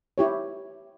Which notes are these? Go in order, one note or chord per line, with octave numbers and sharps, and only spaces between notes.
E4 G4 C#5